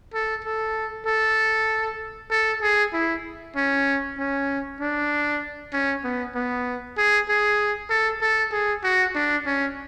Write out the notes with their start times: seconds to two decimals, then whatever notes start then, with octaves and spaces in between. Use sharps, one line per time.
0.14 A4
0.45 A4
1.06 A4
2.31 A4
2.62 G#4
2.93 E4
3.56 C#4
4.18 C#4
4.80 D4
5.73 C#4
6.04 B3
6.35 B3
6.97 G#4
7.29 G#4
7.90 A4
8.22 A4
8.52 G#4
8.84 F#4
9.15 D4
9.46 C#4